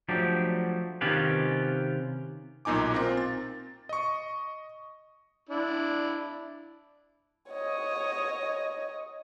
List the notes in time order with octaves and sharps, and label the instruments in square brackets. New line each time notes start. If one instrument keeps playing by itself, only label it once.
[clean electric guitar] F3 F#3 A3 D4 G4
C3 D#3 C#4 F4 G4 B4
[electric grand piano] B1 A#2 D#4 G#5 D6
C4 F4 A#4
A6
D#5 C#6
[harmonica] D4 E4
[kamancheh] C#5 D#5